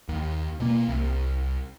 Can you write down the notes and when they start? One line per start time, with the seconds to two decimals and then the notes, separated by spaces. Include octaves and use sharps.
0.09 D#2
0.60 B2 A#3
0.89 C2